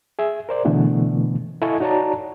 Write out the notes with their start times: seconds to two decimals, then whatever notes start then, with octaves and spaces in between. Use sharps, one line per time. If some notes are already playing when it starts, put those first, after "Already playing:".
0.19 G#4 E5
0.49 A#4 C5 D5
0.65 B2 D3 E3 A3 B3
1.62 E4 A4 D#5 F5 G#5 C#6
1.80 D#4 F#4 C#5 D5 A5 A#5